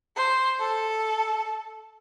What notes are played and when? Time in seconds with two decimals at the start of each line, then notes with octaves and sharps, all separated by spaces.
0.16 C5
0.60 A4